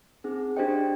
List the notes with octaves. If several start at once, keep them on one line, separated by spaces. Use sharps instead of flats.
C4 D#4 G#4
D4 G4 C5 D#5 G5